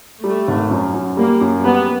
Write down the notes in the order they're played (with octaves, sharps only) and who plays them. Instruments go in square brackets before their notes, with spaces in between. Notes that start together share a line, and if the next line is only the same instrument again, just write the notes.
[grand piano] G3 [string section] A3
[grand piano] G#1
F#2
F#2
[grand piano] G3 [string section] A#3
[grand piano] F#2
[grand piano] G3 [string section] B3